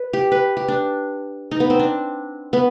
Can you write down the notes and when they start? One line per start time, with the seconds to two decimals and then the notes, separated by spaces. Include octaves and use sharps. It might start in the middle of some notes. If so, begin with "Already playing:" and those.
Already playing: B4
0.13 G4
0.31 B4
0.57 G4
0.68 D4
1.51 D#4
1.60 B3
1.70 C4
1.79 D4
2.53 B3